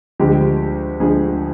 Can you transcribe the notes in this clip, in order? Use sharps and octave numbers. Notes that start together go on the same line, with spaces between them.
D2 D3 F3 G#3 G4
D2 D3 F3 G#3 G#4